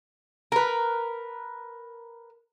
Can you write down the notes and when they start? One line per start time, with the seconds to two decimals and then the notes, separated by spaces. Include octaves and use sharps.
0.52 A#4 B4